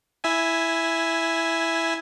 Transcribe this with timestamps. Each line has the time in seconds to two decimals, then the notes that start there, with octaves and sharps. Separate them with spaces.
0.24 E4 E5 G#5